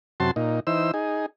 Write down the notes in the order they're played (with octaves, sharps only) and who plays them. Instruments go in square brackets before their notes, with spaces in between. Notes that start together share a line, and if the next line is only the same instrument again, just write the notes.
[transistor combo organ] F#2 C3 F#4 A5 C6
A#2 D#4
E3 D#4 C5 E6
D#4 G#4